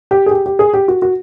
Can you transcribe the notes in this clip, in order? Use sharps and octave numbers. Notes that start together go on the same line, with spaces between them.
G4
G#4
G4
G4
G#4
G4
F#4
F#4